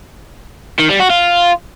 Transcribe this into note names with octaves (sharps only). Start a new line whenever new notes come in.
D#3
G3
F#4
F4